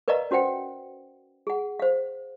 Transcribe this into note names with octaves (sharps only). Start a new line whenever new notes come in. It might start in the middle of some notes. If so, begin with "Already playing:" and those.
A#4 B4 D5 D#5 F5 A#5
C#4 F#4 C5 F#5 G5
G#4 F#5
C5 F5